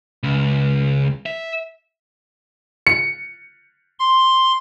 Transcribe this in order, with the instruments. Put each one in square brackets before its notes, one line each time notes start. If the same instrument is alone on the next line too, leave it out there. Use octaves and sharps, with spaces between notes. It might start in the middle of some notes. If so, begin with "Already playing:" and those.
[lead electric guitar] C#2
E5
[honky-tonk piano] C#7
[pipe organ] C6